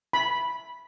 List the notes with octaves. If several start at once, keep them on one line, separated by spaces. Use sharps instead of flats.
B5